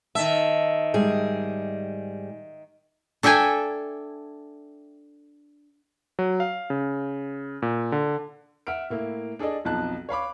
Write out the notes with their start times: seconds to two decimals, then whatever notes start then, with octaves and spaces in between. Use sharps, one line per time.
0.15 D#3 E5 A5
0.94 G#2 G3 G#4
3.23 D4 A4 E5 G5 G#5
6.19 F#3
6.40 F5
6.70 C#3
7.62 A#2
7.92 D3
8.67 E5 F#5 F6 D7
8.90 A2 A#3 E4
9.39 D4 G#4 A4 D5 D#5
9.65 B1 F2 F3 D#4 A5 F#6
10.09 C#5 F5 B5 D6